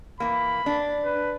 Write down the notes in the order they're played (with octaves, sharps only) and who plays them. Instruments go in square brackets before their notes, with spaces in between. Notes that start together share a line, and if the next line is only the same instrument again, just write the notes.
[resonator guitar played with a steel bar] E3 A#3 [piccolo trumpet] B5
[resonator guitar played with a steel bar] D4
[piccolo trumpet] B4